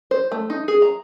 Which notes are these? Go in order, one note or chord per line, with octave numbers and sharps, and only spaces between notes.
C5
A3
D#4
G#4
A#5